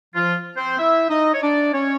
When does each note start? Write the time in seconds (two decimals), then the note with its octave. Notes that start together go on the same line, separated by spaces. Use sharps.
0.14 F3 F4
0.57 C4 C5
0.79 E4 E5
1.10 D#4 D#5
1.34 C#5
1.42 D4 D5
1.74 C#4 C#5